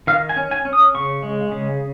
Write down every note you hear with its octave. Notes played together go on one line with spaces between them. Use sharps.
D#3 F5
G#5
C#4
G#5
C#4
D#6
C#3 C#6
G#3
C#3